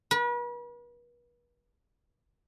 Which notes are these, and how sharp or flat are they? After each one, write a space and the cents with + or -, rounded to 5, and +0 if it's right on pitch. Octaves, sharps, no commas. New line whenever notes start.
B4 -40